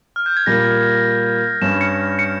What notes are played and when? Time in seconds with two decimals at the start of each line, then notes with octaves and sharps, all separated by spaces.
0.16 F6
0.26 G6
0.37 G#6
0.46 A#2 G3 A#3 A#6
1.62 G2 G3 C#4 E7
1.81 C#7
2.19 C#7